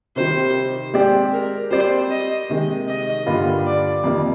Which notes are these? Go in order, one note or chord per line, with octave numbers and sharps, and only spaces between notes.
C3 D#3 G3 C5
G#3 C4 G4 D5
A#4
G3 C4 G4 C5 D5
D#5
C3 D#3 G#3
D#5
G2 D3 G3 A#3 F4
D5
F2 C3 D#3 A#3